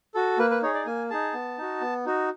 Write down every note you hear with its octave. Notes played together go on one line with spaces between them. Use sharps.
F#4 A4
A#3 B4
B4
D#4 G#4 C#5
D5
A#3 G#5
D#4 G#4 A5
B3
D#4 F#4
B3
D#4 F#4